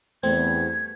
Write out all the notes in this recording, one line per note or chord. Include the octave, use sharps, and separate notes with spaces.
E2 G3 A3 C4 G#6